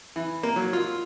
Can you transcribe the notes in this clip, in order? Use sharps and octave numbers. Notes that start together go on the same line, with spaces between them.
E3
A#3
F#3
F4